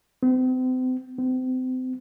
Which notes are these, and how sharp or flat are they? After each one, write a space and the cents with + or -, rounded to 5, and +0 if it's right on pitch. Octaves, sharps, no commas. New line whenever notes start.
C4 -40
C4 -35